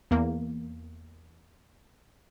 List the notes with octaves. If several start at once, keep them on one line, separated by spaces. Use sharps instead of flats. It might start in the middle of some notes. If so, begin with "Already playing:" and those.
E2 A#3